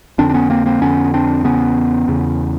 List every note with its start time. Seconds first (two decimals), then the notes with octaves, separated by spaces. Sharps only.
0.18 F2 D3 C4 D4
0.29 D4
0.34 B3 C#4
0.50 A#3 C4
0.66 A#3 C4
0.81 F2 D3 B3 C#4
1.14 C4 D4
1.44 E2 C#3 B3 C#4
2.08 E2 C#3